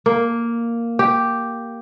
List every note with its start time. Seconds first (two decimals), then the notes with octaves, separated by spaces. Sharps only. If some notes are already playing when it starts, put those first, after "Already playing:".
0.06 A#3
0.99 G4